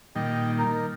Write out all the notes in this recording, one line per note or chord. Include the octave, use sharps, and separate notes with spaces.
A#2 D#3 G3 D#5 G5
D#4 A#4